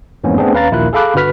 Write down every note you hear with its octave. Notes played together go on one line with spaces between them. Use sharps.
F2 G#2 E3 A#3 B3 C#4
A3 B3 C4 D4 G#4
D#2 C#4 B4 F5 A#5 A6
A#1 D#2 E4 F4 A#4 F#6
G#4 A4 F5 B5 D6 F#6
G1 D3 F#4 B4 F6 B6